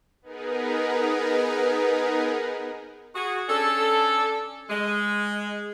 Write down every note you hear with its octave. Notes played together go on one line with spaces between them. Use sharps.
B3 D#4 G#4 A#4 B4
F#4 G#4
C#4 D4 A4
G#3